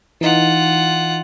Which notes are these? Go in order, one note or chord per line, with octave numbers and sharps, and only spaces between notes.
E3 D#4 F4 F#5